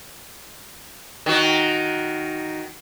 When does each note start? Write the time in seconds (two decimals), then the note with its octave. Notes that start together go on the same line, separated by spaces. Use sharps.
1.26 D#3 F#4